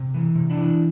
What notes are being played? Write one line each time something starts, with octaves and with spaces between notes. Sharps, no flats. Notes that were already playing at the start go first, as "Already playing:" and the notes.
Already playing: C3
E3
C3
D4 E4
E3